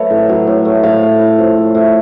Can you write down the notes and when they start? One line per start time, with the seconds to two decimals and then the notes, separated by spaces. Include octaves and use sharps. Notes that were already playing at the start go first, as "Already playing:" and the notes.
Already playing: F#3 A3 B4 C#5
0.10 A2
0.29 F#3
0.47 A2
0.65 A3
0.83 A2 F5
1.02 A3
1.20 A2
1.38 F3
1.57 A2
1.75 A3